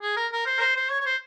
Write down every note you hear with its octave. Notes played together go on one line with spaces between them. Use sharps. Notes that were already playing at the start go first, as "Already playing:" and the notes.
G#4
A#4
A#4
C5
A#4
C5
C5
C#5
C#5
C5